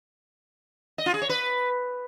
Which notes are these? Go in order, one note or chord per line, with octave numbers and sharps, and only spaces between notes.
D#5
F4
G#4
C#5
B4